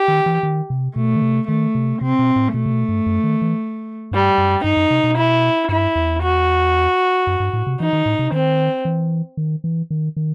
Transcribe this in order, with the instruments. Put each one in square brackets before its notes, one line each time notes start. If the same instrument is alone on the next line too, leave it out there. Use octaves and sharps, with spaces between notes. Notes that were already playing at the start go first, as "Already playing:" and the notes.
Already playing: [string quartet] G4
[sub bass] D#3
E3
D#3
C3
[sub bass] B2 [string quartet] A3
[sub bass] D#3
C3
[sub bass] D#3 [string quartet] A3
[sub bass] C3
[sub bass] C3 [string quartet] C4
[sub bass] B2
A2
[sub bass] B2 [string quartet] A3
[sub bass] C3
B2
G2
F#2
D#3
E3
[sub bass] G2 [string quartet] G3
[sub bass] F#2
[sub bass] G2 [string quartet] D#4
[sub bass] F#2
C3
B2
[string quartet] E4
[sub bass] G2 [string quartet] E4
[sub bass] E2
[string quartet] F#4
[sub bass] F#2
G2
A2
C3
[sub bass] E3 [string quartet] D#4
[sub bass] D#3
A2
C3
[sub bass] D#3 [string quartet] C4
[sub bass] E3
D#3
E3
D#3
D#3